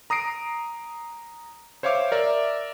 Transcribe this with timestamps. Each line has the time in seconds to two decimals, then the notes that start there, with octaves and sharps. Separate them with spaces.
0.10 A#5 D#6 A#6 C7 D7
1.83 C5 C#5 E5 F5 D6
2.12 A#4 D5 E5